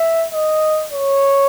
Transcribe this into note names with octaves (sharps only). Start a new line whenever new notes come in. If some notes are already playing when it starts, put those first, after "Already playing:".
Already playing: E5
D#5
C#5